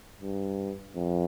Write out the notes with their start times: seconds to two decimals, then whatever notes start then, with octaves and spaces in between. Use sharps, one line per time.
0.21 G2
0.95 F2